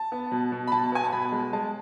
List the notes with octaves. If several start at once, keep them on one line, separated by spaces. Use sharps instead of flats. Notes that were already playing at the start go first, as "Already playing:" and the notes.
Already playing: A5
B3
B2
B2
B5
B2 A5
B3 G#5
A5
B2 B5
G#3
G#3 A5